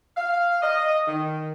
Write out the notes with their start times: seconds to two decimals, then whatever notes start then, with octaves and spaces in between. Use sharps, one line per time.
0.17 F5
0.62 D#5
1.07 D#3